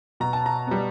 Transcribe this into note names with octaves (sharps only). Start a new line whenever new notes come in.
B2 A#5
A5
A#5
G3 B3